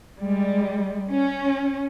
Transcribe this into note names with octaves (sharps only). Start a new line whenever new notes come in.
G3 G#3
C#4